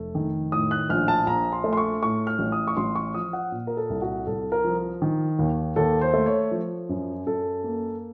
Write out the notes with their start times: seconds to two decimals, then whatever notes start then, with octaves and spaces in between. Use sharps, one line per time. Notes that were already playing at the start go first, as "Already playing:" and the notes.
Already playing: F1 A3
0.15 D#3
0.52 A2 D#6
0.71 F#6
0.89 A#1 F6
1.08 A5
1.27 A#1 A#5
1.52 C6
1.64 A3
1.73 C6
1.77 C#6
2.02 A2 C#6
2.27 F6
2.39 A1
2.52 D#6
2.67 C#6
2.77 A1 C6
2.95 C#6
3.14 F3 D#6
3.33 F#5
3.52 A#2
3.67 A#4
3.77 A4
3.90 C2
4.02 F#4
4.27 C2 A4
4.52 A#4
4.64 F3
5.02 D#3
5.39 D#2
5.76 D#2 A4
6.01 C5
6.14 A3
6.26 C#5
6.51 F3
6.89 F#2
7.26 F#2 A4
7.64 A#3